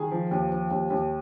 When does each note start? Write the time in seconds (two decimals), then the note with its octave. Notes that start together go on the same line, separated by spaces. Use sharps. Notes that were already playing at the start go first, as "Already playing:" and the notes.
Already playing: D#3 G#4
0.11 F3
0.31 D#2
0.51 F3
0.71 D#2
0.90 D#2